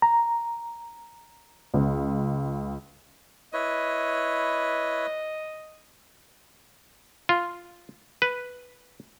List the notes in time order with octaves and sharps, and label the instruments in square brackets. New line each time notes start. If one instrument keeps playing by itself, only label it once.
[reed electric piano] A#5
[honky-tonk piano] C#2
[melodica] E4 B4 C#5 [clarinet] D#5
[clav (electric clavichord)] F4
B4